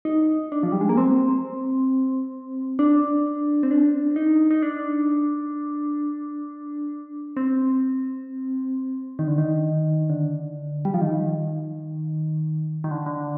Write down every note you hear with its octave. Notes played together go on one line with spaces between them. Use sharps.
D#4
D4
F3
G3
G#3
A#3
C4
D4
C4
D4
D#4
D#4
D4
C4
D#3
D3
D#3
D3
G3
F3
D#3
D#3
D3
D3